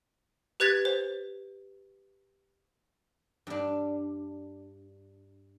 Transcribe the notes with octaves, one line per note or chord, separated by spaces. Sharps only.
G4 B4 F#6 G#6 A6 B6
C5
G2 D4